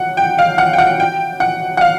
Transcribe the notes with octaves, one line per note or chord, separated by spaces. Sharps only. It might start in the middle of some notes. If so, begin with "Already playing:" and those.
Already playing: F#5
G5
F5
F#5
G5
F#5
G5
F#5
F#5
F5